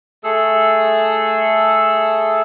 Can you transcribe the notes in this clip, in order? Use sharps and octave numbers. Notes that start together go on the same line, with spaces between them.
A3 G#4 A4 E6